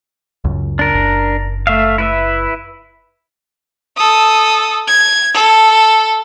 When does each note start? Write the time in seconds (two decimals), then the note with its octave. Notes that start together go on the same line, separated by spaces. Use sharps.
0.44 C#2 F#2
0.79 D4 A#4
0.94 F#1
1.67 A3 E5 F5
1.98 E4 B4 E5
3.96 A4 D#6
4.87 G#6
5.34 A4